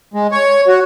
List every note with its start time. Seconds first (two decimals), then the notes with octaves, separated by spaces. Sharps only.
0.14 G#3
0.32 C#5
0.68 F#4